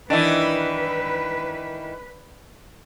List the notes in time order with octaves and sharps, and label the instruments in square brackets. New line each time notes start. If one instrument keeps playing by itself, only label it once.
[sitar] D#3 E3 [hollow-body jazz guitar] D4 [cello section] B4